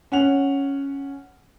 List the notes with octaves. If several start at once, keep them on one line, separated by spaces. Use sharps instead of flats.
C#4 F#5 F7